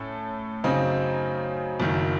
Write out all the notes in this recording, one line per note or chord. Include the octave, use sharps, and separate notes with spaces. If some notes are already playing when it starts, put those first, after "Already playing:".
Already playing: A2 A3 C#4 A4
F#2 C#3 F#3 C4 D#4
F#1 F#2 D#3